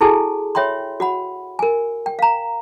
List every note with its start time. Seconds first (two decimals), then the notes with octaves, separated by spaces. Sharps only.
0.01 E4 F#4 G#4 A4 G#5 A5
0.55 C#5 E5 G5 B5 C6
1.00 F#4 F#5 B5
1.59 A#4 G#5
2.06 G5
2.19 F5 A#5